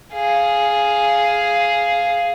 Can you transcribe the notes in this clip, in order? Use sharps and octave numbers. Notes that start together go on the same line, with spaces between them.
G#4 F5